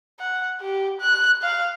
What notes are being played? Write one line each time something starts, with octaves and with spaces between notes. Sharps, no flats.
F#5
G4
F#6
F5